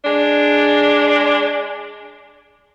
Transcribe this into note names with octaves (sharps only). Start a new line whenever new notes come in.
G#3 D4